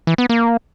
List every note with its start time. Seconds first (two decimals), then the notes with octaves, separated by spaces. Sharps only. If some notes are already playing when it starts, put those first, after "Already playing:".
0.07 E3
0.18 B3
0.29 A#3